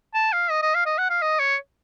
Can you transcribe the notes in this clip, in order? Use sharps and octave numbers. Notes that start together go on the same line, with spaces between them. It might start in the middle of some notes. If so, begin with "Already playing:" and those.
A5
F5
D#5
D#5
F5
D#5
F#5
F5
D#5
C#5